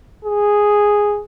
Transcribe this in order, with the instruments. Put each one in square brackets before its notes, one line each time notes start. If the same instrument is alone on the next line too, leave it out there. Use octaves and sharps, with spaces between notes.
[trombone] G#4